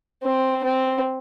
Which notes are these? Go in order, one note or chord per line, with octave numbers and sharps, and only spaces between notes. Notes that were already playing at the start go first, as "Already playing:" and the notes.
C4
C4